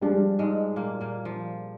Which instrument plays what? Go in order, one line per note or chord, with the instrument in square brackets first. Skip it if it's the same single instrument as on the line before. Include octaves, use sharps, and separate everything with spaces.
[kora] F3 [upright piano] G3 D4 G#4
[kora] G#2 G#3
A#2 A#3
A#2 A#3
F3